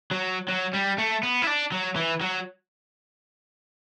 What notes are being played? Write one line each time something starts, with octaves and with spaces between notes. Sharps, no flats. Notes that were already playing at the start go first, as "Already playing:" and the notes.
F#3
F#3
G3
A3
B3
E4
D4
F#3
E3
F#3